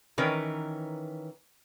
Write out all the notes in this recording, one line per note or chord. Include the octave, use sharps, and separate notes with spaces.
D#3 E3 C#4 A#4 B4